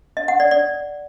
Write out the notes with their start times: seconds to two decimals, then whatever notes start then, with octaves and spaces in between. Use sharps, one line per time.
0.17 D#5
0.28 F#5
0.40 D5
0.51 D5